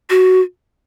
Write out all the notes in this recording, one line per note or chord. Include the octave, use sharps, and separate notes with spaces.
F#4